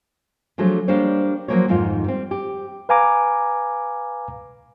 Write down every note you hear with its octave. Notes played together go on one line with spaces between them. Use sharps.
D3 F3 F#3 A3 G#4
G3 A#3 D4 C5 C#5
F3 F#3 G#3 A#3 C5 C#5
F2 G#2 D#3 F4
G3 C4
G4
B4 F5 G#5 A#5 D6